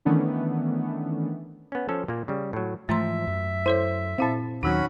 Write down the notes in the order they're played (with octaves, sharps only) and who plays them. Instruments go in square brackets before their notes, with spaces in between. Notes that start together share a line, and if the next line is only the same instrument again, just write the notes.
[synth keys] D#3 E3 A3 B3 C#4 D4
[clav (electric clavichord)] B3 C#4
F3 C#4 A4 C5
A#2 A#3
C#3 G3
A2 F#3
[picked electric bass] G#2 E3 F3 [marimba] A3 A#5 C6 [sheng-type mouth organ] E5
[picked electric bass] F#2
[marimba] E4 A4 C#5 [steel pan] C5
[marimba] A#2 E4 F5 [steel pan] C4 A5
[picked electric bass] D#2 F#3 [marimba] D#3 D#4 [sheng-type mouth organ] C#4 F#4 B5